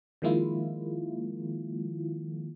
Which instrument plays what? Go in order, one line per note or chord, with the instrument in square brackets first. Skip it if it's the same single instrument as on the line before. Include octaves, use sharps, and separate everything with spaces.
[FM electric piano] D#3 F3 G#3 A#3 E4 F4